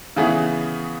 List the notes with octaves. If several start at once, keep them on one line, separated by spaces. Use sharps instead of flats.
C#3 E3 B3 G#4